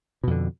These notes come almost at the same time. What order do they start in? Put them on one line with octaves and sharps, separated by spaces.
B2 F2 D3